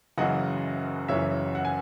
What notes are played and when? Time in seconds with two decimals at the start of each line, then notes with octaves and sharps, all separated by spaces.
0.18 F#1 F#2 C#3 E3 D#5 F#5
1.08 F#1 F#2 C#3 E3 C#5 E5
1.55 F#5
1.65 G#5